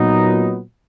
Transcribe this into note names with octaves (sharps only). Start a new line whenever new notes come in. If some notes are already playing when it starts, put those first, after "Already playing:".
Already playing: A#2 F#3 B3 D#4